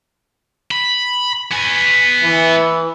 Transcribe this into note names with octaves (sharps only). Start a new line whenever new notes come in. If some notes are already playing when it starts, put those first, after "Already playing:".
B5
B3 G#5
E3